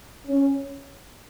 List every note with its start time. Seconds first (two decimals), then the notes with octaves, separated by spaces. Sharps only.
0.27 C#4